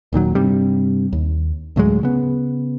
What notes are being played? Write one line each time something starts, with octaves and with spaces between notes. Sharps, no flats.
D#1 A#2 D#3 F#3
G2 C3 G3
D#2
D2 A2 F#3 G#3
C#3 B3